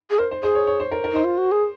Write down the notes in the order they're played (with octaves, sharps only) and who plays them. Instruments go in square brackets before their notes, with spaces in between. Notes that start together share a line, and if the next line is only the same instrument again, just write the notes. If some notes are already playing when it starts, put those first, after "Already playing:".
[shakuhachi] G#4
[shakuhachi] A#4 [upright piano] C5
[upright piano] C5
[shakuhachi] G#4 [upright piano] C5
[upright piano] C#5
C#5
C5
A#4
A#4
[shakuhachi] D#4 [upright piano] C5
[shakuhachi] F4
F#4
G#4